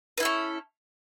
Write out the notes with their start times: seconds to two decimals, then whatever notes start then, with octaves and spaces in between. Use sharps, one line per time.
0.18 B4
0.20 E4
0.23 A4
0.25 C#4